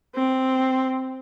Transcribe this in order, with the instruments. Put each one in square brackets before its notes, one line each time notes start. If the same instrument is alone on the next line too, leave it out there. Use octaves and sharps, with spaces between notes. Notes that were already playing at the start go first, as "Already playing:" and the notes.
[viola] C4